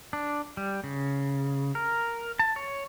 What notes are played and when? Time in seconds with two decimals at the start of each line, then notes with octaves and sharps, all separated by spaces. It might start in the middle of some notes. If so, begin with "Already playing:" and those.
0.13 D4
0.57 G3
0.84 C#3
1.75 A#4
2.39 A5
2.56 C#5